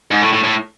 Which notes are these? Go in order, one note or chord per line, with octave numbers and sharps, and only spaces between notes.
G#2
A2
A2
A2